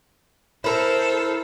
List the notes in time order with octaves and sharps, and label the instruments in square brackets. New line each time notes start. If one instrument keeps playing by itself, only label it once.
[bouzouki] E4 A#4 [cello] A4 C5